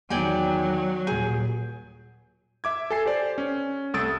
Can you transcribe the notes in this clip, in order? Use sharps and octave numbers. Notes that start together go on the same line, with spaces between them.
E2 D#3 F#3 D5 G5 G#5
D#1 G#4 G6
E5 D6 G#6
A4 G#5 C7
G4 C5 D5
C#4
C2 A3 D#6 E6 A6 D7